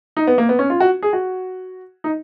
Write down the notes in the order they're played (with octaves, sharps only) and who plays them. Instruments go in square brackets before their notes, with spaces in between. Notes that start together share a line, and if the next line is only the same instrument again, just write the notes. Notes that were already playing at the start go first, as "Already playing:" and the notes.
[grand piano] D#4
B3
A#3
B3
C#4
F4
F#4
G#4
F#4
D#4